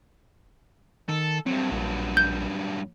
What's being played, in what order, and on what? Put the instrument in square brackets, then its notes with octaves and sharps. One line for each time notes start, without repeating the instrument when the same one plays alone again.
[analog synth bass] D#3 [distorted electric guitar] A4
[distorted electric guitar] G2 F#3 [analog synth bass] C4
[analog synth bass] A#1
[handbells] G6